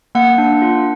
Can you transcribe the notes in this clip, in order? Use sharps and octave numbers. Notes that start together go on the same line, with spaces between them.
A#3 F#5
D4
F4